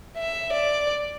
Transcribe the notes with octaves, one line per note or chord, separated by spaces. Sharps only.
E5
D5